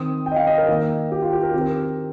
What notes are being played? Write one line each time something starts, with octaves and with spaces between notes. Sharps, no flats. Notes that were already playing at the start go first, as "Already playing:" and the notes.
Already playing: D#3 C4 D#6
G5
D#5
F5
D#5
A#4
D#3 A#3
G4
F4
G4
A#4
D#3 C4 G4
A#4